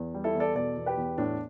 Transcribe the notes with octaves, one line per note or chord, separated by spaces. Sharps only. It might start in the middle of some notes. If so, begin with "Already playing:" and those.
Already playing: E2
G3
E4 A4
E2
A4 D5
B2 A4 D5
E2
G4 B4
E2
A2 D4